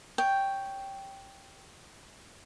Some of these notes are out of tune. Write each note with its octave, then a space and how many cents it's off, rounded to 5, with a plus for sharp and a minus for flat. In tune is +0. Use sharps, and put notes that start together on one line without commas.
C#5 +0 G5 +0